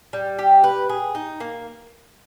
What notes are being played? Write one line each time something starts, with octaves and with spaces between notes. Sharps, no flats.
G3
G4
B4
G#4
D#4
A#3